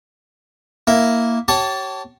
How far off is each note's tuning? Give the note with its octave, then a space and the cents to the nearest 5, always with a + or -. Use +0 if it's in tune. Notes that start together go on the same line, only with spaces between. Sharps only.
A#3 +0 E4 +0
G4 -40 C#5 -15 A5 +0